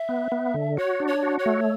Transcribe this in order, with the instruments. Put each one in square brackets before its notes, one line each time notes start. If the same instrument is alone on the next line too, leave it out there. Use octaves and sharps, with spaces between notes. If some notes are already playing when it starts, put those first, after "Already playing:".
Already playing: [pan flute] E5
[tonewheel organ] B3
B3
D3
[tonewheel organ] F#4 [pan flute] C#5
[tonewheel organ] D4
[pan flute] C#5
[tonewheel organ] F#4
[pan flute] C#5
[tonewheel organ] A3